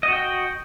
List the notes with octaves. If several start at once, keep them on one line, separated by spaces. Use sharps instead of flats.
F#4 D#5 G5